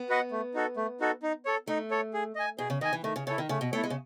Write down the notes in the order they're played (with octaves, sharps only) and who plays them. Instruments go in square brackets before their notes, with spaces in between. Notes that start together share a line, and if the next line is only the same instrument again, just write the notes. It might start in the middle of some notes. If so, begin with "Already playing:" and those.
Already playing: [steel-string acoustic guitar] B3
[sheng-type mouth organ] F#4 B4 D#5 F#5
A3
D#4 F#4 A4
A3
D#4 F#4 A4
D#4
A4 C#5
[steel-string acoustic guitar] A3 [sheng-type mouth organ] D#4
[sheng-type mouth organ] A4 C#5
G#4
D#5 G#5
[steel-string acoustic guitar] B2 [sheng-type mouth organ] G#4
[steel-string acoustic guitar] C#3
[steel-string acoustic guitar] D#3 [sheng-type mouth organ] D#5 G#5
[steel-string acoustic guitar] E3
[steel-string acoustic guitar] D#3 [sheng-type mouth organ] A3
[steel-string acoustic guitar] C#3
[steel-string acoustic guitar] C#3 [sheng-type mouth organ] E4 A4 C#5
[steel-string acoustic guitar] D#3
[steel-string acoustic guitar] C#3 [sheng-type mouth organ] A3
[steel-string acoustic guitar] B2
[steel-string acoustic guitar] A3 [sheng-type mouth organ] E4 A4 C#5
[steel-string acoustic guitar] G#3
C#3